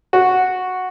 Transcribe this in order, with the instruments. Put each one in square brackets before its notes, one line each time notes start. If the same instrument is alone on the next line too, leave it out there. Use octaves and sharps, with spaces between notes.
[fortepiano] F#4